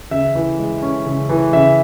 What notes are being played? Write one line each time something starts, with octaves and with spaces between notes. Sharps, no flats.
C#3 E5
E3
G#3
C#4
C#3
E3
C#3 E5